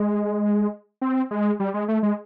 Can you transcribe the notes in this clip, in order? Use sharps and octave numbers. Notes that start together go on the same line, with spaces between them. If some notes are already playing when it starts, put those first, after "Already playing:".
Already playing: G#3
C4
G#3
G3
G#3
A3
G#3